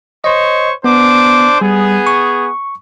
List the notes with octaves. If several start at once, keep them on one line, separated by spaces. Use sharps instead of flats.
C5 C#5 D#5 C#6
B3 D4 C5 D6
G3 B3 G#4
C#6